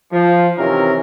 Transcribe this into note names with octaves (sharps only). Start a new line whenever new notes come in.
F3
C3 D#3 E3 C#4 A#4